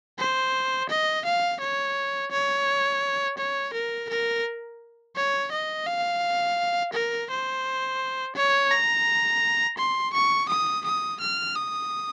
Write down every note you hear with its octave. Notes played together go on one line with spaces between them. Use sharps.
C5
D#5
F5
C#5
C#5
C#5
A#4
A#4
C#5
D#5
F5
A#4
C5
C#5
A#5
C6
C#6
D#6
D#6
F6
D#6